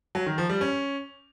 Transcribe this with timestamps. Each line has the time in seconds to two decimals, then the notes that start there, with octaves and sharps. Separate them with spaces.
0.15 F#3
0.26 D#3
0.38 F3
0.49 G3
0.61 C#4